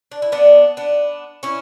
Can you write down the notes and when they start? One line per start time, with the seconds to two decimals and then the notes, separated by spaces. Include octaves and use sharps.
0.12 D4
0.22 E4
0.32 B3 D4
0.77 B3 D4
1.43 C#4 E4